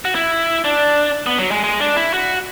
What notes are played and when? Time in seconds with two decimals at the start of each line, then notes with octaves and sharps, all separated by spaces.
0.05 F#4
0.15 E4
0.65 D4
1.26 B3
1.38 F#3
1.51 G#3
1.64 G#3
1.80 D4
1.96 E4
2.14 F#4